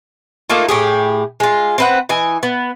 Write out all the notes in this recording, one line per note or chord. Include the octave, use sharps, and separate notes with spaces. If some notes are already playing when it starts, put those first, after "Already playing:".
A3 A#3 D#4 F4
A2 G4 G#4
G#3 F4
C4 B4 F#5
E3 D#5 G#5
B3